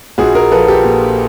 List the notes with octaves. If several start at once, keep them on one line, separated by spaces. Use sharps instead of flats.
A#1 F#4 G#4
G#4 A#4
F3 A4 B4
G4 A4
A#2